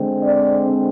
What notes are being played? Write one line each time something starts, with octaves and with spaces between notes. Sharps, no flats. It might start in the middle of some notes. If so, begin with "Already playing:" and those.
Already playing: D3 G#3 C4
D5